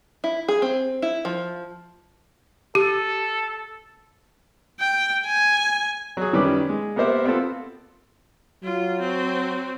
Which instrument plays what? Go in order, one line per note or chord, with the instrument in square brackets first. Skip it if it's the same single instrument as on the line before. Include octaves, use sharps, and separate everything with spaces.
[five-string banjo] E4
G#4
C4
E4
F3
[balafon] G4 [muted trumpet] A4
[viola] G5
G#5
[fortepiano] F#3 G#4
F#2 D#3 G3 C#4 B4 D6
G#3
A#3 B3 G4 A#4 C5 E5
B3 C4 F4 A4
[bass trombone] F#3 [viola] F4
[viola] C4 F#4